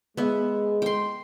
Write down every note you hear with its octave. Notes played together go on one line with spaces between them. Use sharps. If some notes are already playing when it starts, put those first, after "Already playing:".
G#3 B3 E5
G5 C6